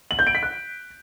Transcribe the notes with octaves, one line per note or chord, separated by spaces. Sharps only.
F#7
G6
D7
B6
F#6